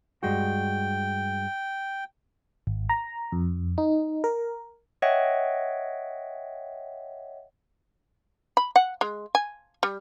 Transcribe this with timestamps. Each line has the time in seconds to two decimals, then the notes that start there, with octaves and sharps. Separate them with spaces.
0.23 G2 G#3 F#4 G5
2.67 G#1
2.89 A#5
3.32 F2
3.78 D#4
4.24 A#4
5.02 C#5 D#5 E5 F#5 G5
8.57 B5
8.76 F#5
9.01 G#3
9.35 G#5
9.83 G3